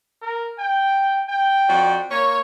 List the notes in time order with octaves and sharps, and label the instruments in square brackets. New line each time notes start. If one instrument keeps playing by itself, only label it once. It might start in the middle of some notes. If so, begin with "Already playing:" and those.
[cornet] A#4
G5
G5
[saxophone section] F2 F#4 D5
[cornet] A#3 [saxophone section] C#5